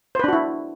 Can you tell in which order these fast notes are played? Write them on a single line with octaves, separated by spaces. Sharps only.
C5 B4 D4 F#4 E4